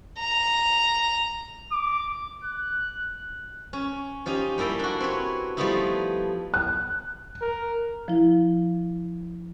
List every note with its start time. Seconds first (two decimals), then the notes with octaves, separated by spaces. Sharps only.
0.19 A#5
1.72 D6
2.44 F#6
3.73 C#4
4.26 F3 C#4 D#4 G4
4.58 G3 A#3 E4 A4 G5
4.79 D4 F#4
5.00 C4 B4 C#5
5.57 F3 G3 A3 B3 D#4 E4
6.54 F#6
7.41 A#4
8.08 F3 E4